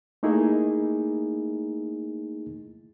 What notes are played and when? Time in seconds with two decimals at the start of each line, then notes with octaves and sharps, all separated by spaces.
0.23 A3 A#3 D#4 E4 G#4